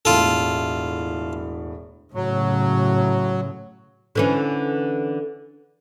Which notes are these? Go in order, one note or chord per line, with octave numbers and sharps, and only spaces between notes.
E1 A2 F4 A4
A2 C#3 F#3
D3 E3 C#4